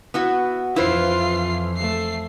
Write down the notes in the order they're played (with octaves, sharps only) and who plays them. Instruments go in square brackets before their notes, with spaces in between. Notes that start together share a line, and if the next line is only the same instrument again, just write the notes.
[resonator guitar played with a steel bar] B3 E4 F#4
[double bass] F2 E3 [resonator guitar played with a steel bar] E4 B4 C5 [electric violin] F4 C7
[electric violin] A3 C7